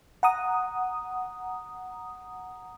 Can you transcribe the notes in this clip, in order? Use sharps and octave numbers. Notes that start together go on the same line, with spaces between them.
F#5 A#5 D#6